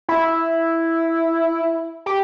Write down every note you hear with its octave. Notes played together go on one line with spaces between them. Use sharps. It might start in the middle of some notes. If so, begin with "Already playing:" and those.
E4
G4